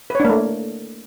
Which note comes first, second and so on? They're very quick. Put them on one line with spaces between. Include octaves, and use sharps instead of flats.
B4 C#5 D4 A#3 A3